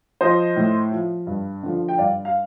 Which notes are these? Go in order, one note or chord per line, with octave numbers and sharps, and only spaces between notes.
F3 C5 D#5
A2
F3
G2
D3 F3
G5
G2 D5 F5
F5